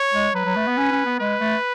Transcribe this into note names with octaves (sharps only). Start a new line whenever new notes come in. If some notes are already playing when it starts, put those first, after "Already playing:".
Already playing: C#5
G#3
F#3 B4
F#3
A3
B3
C#4
C#4
B3
G#3 B4
A3